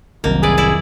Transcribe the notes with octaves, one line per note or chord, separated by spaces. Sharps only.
F1 C2 F2 C3 D#3 F#3 A#3
E4 G#4 B4 D5
E4 D5